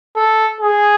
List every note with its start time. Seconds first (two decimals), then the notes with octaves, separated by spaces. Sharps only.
0.16 A4
0.61 G#4